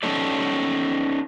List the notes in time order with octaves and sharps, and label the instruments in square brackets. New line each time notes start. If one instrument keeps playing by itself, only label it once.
[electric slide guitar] C#4 D#4 A4 D5